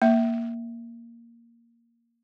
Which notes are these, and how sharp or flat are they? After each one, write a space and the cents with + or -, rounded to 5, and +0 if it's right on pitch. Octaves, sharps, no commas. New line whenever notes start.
A#3 +0 E5 +0